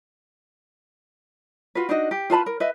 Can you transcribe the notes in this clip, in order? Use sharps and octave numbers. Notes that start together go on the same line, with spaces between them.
F4 F#4 B4
D4 D#4 F#4 D#5
G4
F4 B4 A5 B5
A#4
B4 D#5 E5